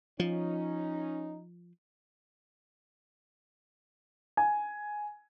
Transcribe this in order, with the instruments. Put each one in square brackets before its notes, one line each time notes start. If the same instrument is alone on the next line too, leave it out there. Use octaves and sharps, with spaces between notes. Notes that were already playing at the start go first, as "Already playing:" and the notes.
[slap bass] F3 [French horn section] C#4 D#4
[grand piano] G#5